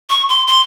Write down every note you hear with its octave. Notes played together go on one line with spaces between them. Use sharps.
C#6
C6
C6